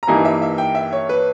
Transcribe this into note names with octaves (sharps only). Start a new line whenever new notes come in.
A#5
G2 E3 G3 A#3 D#4 G#5
E5
E5
G5
E5
C#5
B4